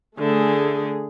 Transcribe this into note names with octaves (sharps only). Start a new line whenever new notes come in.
D3 A3 G#4